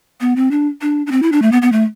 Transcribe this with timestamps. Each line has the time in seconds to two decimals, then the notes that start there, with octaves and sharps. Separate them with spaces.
0.21 B3
0.36 C4
0.51 D4
0.82 D4
1.07 D4
1.12 C4
1.22 E4
1.32 D4
1.42 A3
1.52 B3
1.62 B3
1.72 A3